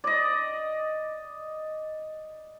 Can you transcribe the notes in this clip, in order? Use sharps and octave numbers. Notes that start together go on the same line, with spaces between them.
D5 D#5